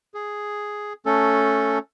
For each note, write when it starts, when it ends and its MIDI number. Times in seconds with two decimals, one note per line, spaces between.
0.14 0.93 68
1.06 1.78 57
1.06 1.78 61
1.06 1.78 69